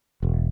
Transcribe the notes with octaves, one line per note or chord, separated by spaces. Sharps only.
E1